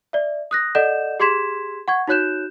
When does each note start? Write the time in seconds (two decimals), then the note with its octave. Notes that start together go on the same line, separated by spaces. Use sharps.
0.13 D5 E5
0.51 D#6 F#6 A#6
0.75 A4 D5 D#5 F#5 G6 E7
1.20 G4 G#4 C6 G#6 B6 E7
1.88 F#5 C#6 G#6
2.08 D#4 F#4 C#5 F#6 G6 E7